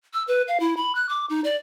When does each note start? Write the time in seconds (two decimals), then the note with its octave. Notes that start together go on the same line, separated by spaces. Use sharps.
0.13 E6
0.28 B4
0.48 F5
0.60 E4
0.77 B5
0.95 F#6
1.09 D6
1.30 D#4
1.44 D5